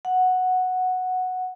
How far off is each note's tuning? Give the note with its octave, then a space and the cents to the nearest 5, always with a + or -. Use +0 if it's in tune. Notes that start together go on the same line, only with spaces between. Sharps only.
F#5 -5